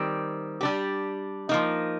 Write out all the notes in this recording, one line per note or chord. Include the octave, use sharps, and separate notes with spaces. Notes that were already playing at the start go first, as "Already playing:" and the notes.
Already playing: D#3 G3 C4 G4
G3 D4 G4
F3 A#3 D#4